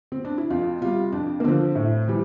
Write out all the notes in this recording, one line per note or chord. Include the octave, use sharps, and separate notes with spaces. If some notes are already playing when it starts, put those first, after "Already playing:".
C4
D4
E4
F2 F4
C3 G3 F4
F2 D4
A#3
D3 F3 C4
A2
E3 G3